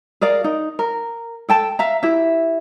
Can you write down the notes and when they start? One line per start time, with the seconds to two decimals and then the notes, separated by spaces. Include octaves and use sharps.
0.21 G#4 A#4 D5 F5
0.44 D#4
0.79 A#4
1.49 A4 G5 A5
1.79 E5 F5 A#5
2.03 E4 G4 E5